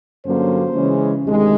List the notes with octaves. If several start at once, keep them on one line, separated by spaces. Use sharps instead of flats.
G2 D3 F#3 A#3 C#4 C5
C#3 E3 G#3 C#4
D2 C3 D#3 G#3